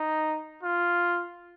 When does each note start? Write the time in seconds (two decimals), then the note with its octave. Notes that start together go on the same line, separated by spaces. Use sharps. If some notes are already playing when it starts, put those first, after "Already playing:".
Already playing: D#4
0.63 F4